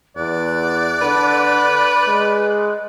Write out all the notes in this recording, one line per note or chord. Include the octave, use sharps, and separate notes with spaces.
E2 D5 F#6
D3 B4
G#3